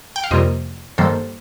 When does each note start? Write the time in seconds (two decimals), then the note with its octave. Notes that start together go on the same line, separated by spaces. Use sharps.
0.16 G5
0.24 F5
0.31 F2 C3 G3 A#3 C5 D#5
0.98 G2 D#3 G3 A#3 A4 C5